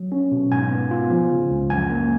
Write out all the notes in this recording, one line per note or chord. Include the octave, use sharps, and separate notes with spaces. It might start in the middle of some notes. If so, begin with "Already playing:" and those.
Already playing: F#3
C#4
B2
G#2 G#5
B3
F4
F3
C#3
C#2
F#2 G#5
A#3